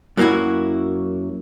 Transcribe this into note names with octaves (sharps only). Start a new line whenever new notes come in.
F#2 F#3 A#3 D4 E4 F#4